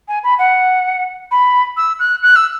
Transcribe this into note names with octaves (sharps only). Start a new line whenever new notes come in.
G#5
B5
F#5
B5
E6
F#6
F#6
E6